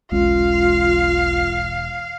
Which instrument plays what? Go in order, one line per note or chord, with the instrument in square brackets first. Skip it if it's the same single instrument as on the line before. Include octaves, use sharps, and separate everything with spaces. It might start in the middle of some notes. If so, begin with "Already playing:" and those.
[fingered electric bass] E1 G#3 C#4 [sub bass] B1 [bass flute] F4 [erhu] F5